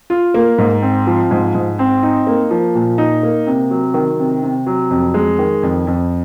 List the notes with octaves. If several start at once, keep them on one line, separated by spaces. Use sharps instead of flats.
F4
A#3
G#2
C4
F3
G#2
G#2
C4
D#4
A#3
F3
A#2
D#4
A#3
C3
F#3
D#3
C3
C3
F#3
F2
G#3
D#3
F2
F2